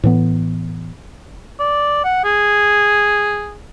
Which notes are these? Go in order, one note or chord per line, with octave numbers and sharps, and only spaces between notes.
A2 E3 B3
D5
F#5
G#4